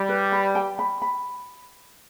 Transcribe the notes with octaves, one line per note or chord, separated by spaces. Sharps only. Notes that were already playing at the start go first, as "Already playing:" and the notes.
Already playing: G3 B5
B4
B5
G5
B5
B5